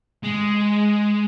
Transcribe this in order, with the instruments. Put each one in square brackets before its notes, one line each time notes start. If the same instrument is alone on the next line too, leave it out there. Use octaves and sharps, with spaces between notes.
[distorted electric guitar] G#3